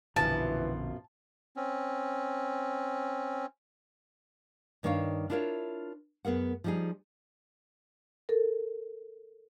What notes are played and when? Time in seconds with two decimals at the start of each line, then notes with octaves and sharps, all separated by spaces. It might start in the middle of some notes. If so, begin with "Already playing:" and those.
0.16 A#1 F#2 B2 D3 E3 F3 A5
1.56 C4 C#4
4.83 G2 D#3 D4 C#5 F5
5.30 D4 E4 F4 A#4 C5 C#5
6.25 F#2 B3 G#4 A#4 F#5
6.64 F3 G3 D#4 G4 G#4
8.29 A4 A#4